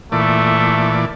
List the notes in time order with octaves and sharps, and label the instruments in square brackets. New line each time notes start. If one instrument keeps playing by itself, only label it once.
[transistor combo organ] A#2 E3 D5 [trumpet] A3